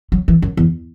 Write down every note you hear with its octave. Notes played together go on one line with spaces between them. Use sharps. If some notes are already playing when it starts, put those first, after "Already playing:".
F#3
E3
F#2
E2